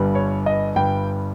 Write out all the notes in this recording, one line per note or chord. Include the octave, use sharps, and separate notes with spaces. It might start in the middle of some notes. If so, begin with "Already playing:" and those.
Already playing: G1 G2 G3
C#5
D#5
G1 G2 G3 G5